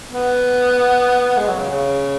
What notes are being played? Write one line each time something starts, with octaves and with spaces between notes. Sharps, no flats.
B3
G#3
F#3
C#3
C#3